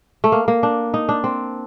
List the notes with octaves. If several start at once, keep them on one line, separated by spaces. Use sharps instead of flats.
A3
A#3
A#3
D4
D#4
D4
C4